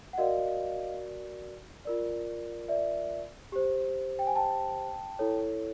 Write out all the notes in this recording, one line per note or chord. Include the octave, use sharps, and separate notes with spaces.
F#5
F#4 A#4 D5 D#5 F5
F4 A#4 D5
D5 E5
G4 C5
G5
G#5
G5 A5
E4 A4 C#5